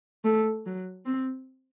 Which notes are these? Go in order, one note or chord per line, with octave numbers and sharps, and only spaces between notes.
A3
F#3
C4